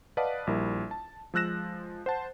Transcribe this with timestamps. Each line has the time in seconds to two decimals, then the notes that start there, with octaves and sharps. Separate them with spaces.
0.17 B4 D5 D#5 F5 F#5 A5
0.47 A#1 G3 E4 A#4
0.91 A5
1.34 F3 G#3 E6 F#6 A#6 E7
2.06 C5 F#5 A5